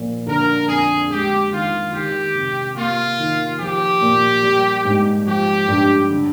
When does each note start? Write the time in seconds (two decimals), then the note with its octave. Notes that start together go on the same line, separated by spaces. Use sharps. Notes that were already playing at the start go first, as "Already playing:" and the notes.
Already playing: A#2 F3
0.26 D3 A#4
0.68 F2 G#4
1.10 G#3 G4
1.51 D#3 F4
1.93 D#3 G4
2.35 C3
2.76 A#3 F4
3.19 D#3
3.60 F3 G4
4.01 A#2
4.43 G3
4.85 G#2
5.26 F3 G4
5.68 G2
6.10 D3